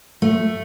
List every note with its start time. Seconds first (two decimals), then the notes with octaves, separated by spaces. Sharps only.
0.22 A3